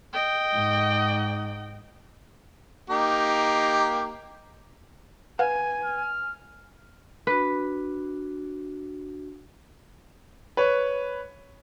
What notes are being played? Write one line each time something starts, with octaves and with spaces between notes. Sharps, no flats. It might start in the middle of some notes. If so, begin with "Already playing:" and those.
D#5 G5
G#2
A#3 D#4 G4
B4 F5 F#5 G#5
F6
D4 F#4 B4
B4 C#5